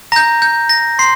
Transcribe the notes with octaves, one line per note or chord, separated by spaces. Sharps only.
A#5 G6 A#6
G6
A#6
C6 C7